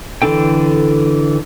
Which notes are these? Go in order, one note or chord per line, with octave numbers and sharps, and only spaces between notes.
D3 E3 D4 A4 G5